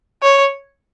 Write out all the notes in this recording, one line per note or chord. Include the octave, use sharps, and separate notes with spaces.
C#5